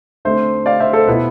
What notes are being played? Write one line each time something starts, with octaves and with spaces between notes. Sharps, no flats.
D3 A3 C4 C5 E5
D5 F5
C5 E5
A4 C5
B2 B3 E4 B4